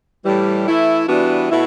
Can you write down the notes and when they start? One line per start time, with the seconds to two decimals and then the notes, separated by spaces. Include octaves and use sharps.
0.25 A2 E3 G3
0.67 E3 A3 E4
1.08 E3 G3 B3 D4 F#4
1.50 B2 A3 E4